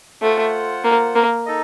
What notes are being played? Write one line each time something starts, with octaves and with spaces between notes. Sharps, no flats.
A3 F4 C5 F#5
A#3
A#3
D#4 A4 D#5